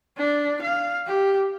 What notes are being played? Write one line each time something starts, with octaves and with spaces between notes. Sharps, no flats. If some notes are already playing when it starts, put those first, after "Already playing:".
D4
F5
G4